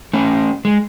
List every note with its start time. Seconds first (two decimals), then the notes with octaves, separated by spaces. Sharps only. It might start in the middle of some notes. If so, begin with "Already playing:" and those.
0.13 A3 C#4
0.65 G#3